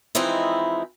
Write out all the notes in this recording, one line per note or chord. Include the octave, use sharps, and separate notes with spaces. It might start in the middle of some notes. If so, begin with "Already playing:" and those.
E3 F3 G#3 C4 D#4 E4